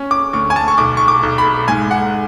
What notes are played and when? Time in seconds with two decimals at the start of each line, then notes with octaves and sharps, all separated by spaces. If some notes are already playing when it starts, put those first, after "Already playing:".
Already playing: C#4
0.11 D6
0.33 D2 C#6
0.50 G#5
0.56 A5
0.68 C#6
0.78 B1 D6
0.97 C#6
1.08 D6
1.23 B1
1.38 B5
1.68 G#2 G#5
1.91 F#5